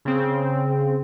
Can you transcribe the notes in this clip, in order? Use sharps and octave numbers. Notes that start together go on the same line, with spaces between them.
C#3 C4